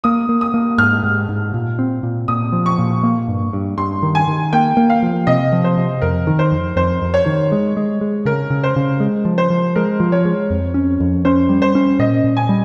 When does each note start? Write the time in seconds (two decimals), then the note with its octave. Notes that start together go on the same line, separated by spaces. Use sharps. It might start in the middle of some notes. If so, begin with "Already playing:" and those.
0.04 A#3 D#6
0.29 A#3
0.41 D#6
0.54 A#3
0.78 G#2 F6
1.03 G#2
1.29 G#2
1.54 A#2
1.79 C4
2.03 A#2
2.28 A#2 D#6
2.53 F3
2.66 C#6
2.79 A#2
3.04 A#3
3.28 G2
3.53 G2
3.78 G2 C6
4.03 D#3
4.15 G#5
4.28 D#3
4.53 A#3 G5
4.77 A#3
4.90 F5
5.03 F3
5.27 C3 D#5
5.52 F3
5.64 C5
5.77 C3
6.02 F2 A#4
6.27 D#3
6.39 C5
6.52 F2
6.76 F2 C5
7.02 F2
7.14 C#5
7.26 D#3
7.52 G#3
7.77 G#3
8.01 G#3
8.25 C#3 A#4
8.50 C#3
8.64 C5
8.76 C#3
9.00 G#3
9.25 F3
9.38 C5
9.50 F3
9.76 G#3 A#4
10.00 F3
10.12 C#5
10.25 G#3
10.50 F2
10.74 C#4
11.00 F2
11.25 C#4 C5
11.49 G3
11.62 C5
11.75 C#4
11.99 A#2 D#5
12.24 A#2
12.37 G#5
12.49 G3